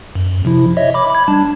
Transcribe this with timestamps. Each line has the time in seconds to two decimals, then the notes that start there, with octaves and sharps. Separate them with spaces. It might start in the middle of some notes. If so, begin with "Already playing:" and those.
0.15 F#2
0.45 C3 F3 E4
0.77 C#5 D#5 E5
0.94 B5 D6
1.10 B5 G#6
1.28 G3 D4 A5